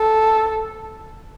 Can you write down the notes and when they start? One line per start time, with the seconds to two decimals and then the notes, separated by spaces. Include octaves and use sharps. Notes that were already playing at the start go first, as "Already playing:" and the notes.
Already playing: A4